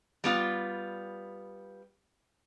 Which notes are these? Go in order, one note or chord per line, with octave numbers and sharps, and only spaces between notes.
G3 B3 F4